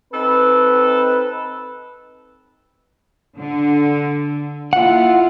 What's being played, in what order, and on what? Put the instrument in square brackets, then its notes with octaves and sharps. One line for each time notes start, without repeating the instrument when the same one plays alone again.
[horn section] C4 D#4 A4 B4
[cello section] D3
[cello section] A#3 E4 F4 [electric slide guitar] F#5